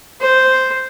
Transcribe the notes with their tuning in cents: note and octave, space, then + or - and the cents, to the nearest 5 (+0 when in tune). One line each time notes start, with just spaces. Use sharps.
C5 -5